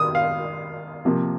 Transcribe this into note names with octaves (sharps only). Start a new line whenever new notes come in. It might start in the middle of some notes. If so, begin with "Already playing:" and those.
Already playing: D#3 D#6
F5
C3 F3 A#3